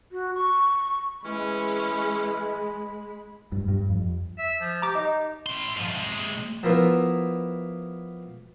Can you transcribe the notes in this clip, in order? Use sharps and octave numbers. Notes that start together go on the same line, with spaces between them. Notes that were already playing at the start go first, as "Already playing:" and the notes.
F#4
C#6
E3 G#3 C#4 B5
G2
G2
F2
E5
F3
G4 A#5 D6
D#4 D#5
E4 C6
G#2 F3
C3 G#3
F3 A#3 B3 E4 F4